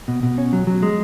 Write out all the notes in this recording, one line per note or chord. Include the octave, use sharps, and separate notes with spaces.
B2
B2
C#4
F#3
F#3
G#3